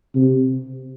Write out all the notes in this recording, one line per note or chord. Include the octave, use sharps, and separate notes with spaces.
C3